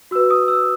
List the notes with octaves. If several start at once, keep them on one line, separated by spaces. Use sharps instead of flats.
F#4 B4 E6
D#6
E6